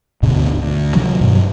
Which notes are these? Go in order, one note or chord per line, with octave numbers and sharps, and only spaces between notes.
D2 G#2 B2 D3
D2
C3 D#3 F3 F#3
G2 B2 F#3